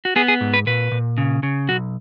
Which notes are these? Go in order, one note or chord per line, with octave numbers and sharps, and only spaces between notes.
F#4
B3 G#4
G#4
G#2
B4
A#2 B4
A#2
C#3
C#3
B1 F#4